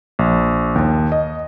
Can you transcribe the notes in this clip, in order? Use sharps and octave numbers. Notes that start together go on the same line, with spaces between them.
A#1
D#2
D#5